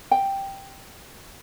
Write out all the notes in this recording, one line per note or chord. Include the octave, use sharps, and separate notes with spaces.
G5